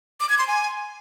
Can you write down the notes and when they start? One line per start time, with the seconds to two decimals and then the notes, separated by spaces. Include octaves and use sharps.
0.20 D6
0.29 G#6
0.38 C6
0.48 G#5